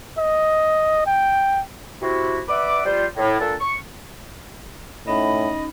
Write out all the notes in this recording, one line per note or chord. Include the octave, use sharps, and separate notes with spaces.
D#5
G5
C3 E4 F#4
B4 D5 E5 F#5 D6
G3 F4 C5
A2
A#2 D4 A4
C#6
A2 C#4 D#4 D#5 B5